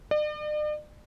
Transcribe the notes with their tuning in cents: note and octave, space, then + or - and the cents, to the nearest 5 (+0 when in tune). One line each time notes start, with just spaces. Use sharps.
D5 +45